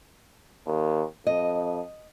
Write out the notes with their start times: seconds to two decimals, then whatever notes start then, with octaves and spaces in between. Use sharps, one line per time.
0.66 D#2
1.27 F2 D#5